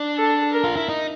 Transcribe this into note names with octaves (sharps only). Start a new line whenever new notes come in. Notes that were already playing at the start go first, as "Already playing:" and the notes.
Already playing: D4
A4
A#4
F4
E4
D#4